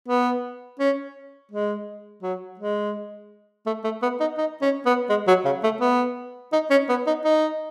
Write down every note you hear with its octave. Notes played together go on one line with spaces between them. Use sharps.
B3
C#4
G#3
F#3
G#3
A3
A3
B3
D#4
D#4
C#4
B3
G#3
F#3
C#3
A3
B3
D#4
C#4
B3
D#4
D#4